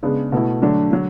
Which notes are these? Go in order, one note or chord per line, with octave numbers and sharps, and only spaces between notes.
C#3 G#3 B3 D4
B2 A3 E4
D3 F#3 A3 D4
D3 F#3